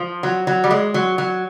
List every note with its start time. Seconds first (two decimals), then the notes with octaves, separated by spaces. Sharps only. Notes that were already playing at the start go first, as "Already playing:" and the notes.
Already playing: F3
0.23 F#3
0.47 F#3
0.64 G3
0.71 G#3
0.94 F#3
1.18 F#3